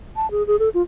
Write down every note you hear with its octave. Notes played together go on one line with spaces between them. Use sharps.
A5
G#4
G#4
A4
F4